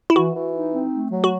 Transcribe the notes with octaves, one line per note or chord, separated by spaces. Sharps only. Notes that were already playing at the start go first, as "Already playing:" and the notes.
E4
E3 F#4
E3
D#4
C4
A3
F#3
F#4